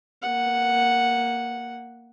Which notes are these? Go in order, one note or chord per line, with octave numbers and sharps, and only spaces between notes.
A#3 F#5